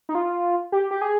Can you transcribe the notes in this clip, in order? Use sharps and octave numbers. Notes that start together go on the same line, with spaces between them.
D#4
F4
G4
G4
G#4